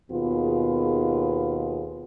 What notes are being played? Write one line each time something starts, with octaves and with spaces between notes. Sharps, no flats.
D#2 B2 B3 F4 G#4